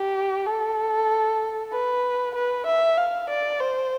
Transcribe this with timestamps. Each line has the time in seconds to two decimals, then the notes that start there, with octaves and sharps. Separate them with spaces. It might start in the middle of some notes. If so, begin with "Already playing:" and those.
Already playing: G4
0.46 A4
1.73 B4
2.35 B4
2.66 E5
2.97 F5
3.30 D5
3.60 C5